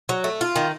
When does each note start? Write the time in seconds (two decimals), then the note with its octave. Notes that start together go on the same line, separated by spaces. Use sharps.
0.09 F#3
0.24 A3
0.41 F4
0.56 D#3